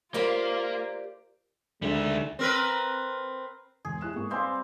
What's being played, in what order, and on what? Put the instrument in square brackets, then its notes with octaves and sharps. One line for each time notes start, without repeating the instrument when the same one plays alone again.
[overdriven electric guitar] A#3 [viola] F4 [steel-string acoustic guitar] G4 C5 D5 [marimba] A#4
[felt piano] D2 D#3 [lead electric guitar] G3 E5 [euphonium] G#3
[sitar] C4 A#4 B4
[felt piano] E1 [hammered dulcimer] G#4
[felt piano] E4 F#6 E7
G#2 A#3 C#6
[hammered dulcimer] G3 C4 [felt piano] B4 F5 G#5